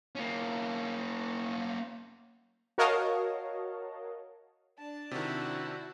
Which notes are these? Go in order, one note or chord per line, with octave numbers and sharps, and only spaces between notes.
A#3 C#4
F#4 A#4 C#5 D#5 F5 A5
D4 A5
C3 D#3 E4 F#4